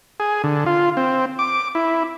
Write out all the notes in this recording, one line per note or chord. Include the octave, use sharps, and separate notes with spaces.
G#4
D3
F4
C4
D6
E4